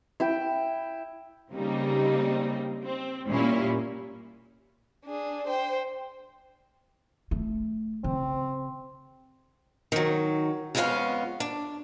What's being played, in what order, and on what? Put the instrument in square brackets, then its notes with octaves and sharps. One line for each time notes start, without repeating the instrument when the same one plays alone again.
[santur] E4 E5 G5
[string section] C#3 G3 A#3 C4 D#4
C4
A#2 G3 C#4 E4
[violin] D4 G#4
C5 G5
[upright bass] A3
[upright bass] C#3 [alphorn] C4
[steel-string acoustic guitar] D#3 F#3
F2 G#3 B3 C#4 F#4 F5
D4